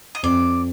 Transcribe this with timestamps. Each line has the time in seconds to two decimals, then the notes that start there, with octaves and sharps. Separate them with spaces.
0.15 D#5
0.23 F2 D5